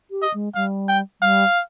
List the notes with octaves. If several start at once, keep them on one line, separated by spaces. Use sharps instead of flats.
G4
D#5
G#3
G3 F5
G5
G3 F5